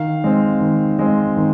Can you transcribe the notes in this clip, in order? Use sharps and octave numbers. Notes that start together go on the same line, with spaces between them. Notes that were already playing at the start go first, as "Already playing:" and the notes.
Already playing: D#3 F5
G#3 C4
D#3
G#3 C4
D#3